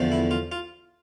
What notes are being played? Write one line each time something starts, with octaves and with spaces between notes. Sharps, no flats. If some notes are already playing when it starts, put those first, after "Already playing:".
Already playing: E2 D3 F3 A3
E4
F4
F4